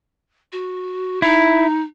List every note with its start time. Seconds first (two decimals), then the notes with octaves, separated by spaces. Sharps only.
0.52 F#4
1.22 D#4 E4